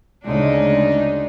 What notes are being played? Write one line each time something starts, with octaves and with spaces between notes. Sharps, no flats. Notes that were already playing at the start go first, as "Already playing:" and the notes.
D2 C#3 G#3 D4 D#4